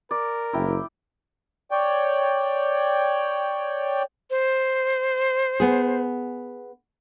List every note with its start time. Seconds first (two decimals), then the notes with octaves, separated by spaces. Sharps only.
0.11 A#4 D5
0.53 F#1 E4 G5
1.71 C#5 D5 G5
4.30 C5
5.60 B3 G#4